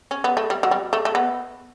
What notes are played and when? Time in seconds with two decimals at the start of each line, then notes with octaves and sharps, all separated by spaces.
0.11 C#4
0.24 B3
0.37 A3
0.50 G3
0.63 F#3
0.71 G3
0.93 A3
1.05 A3
1.15 B3